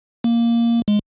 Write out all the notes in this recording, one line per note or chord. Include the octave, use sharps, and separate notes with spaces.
A#3
G#3